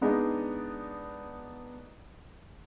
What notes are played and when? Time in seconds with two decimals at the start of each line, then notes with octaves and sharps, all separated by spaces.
0.01 G#3 B3 D4 D#4 D5